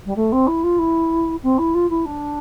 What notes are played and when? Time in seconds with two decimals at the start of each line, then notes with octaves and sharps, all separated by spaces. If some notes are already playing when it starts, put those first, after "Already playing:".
0.05 G3
0.16 A3
0.32 C4
0.47 E4
0.63 F4
0.78 E4
1.43 C4
1.58 E4
1.74 F4
1.89 E4
2.05 D4